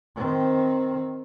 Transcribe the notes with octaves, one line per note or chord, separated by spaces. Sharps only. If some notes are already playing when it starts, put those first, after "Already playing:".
D#3 C4